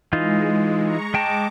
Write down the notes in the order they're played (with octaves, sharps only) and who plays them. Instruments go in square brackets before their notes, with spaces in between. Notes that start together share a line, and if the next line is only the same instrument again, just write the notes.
[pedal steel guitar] E3 D#4 F4 [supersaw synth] G#3
[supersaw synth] A#5 C#6
[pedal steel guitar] G#3 G5 A5 [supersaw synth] D6